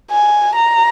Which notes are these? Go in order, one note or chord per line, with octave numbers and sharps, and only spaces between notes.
G#5
A#5